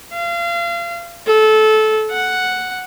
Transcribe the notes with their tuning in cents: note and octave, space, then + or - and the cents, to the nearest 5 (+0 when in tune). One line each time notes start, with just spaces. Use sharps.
F5 -30
A4 -20
F#5 +0